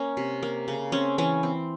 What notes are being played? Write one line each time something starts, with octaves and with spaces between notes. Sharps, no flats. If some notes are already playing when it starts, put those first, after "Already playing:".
Already playing: A#3 C#4
C3
A#3
C#3
C4 C#4
E3 C#4
C4